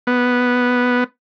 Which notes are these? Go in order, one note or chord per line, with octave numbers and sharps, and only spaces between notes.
B3